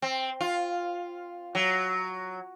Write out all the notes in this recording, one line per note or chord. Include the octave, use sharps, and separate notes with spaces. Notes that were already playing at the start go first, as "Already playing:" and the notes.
C4
F4
F#3